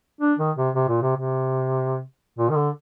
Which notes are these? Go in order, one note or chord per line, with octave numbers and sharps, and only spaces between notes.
D4
D#3
C3
C3
A#2
C3
C3
A#2
D#3
D3